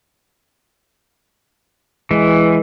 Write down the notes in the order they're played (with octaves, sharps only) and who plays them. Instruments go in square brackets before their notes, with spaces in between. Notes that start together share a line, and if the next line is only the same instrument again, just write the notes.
[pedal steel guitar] E3 [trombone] G#3